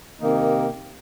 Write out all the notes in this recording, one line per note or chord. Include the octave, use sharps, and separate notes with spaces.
C3 D#3 A#3 D#4 G4